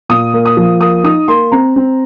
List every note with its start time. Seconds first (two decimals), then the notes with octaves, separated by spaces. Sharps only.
0.09 A#2 D#6
0.34 A#3
0.46 D#6
0.57 F3
0.80 A#3 D#6
1.04 D#4 D#6
1.28 A#3 C6
1.52 C4 A#5
1.76 C4